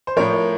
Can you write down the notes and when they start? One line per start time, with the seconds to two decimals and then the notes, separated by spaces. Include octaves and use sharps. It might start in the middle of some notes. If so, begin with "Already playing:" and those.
0.07 C5
0.16 A2 F3 A#4 C#5